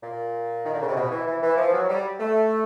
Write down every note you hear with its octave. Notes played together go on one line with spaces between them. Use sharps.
A#2
D#3
D3
C#3
C3
B2
E3
E3
E3
F3
F#3
G3
A3